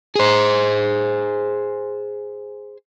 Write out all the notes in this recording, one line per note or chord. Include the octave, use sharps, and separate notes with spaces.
G#4 C5